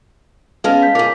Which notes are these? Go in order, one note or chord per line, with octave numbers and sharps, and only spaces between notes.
G#3 B3 C#4 F5 A5 F6
G6 B6
F4 G#4 A#4 C#5 D6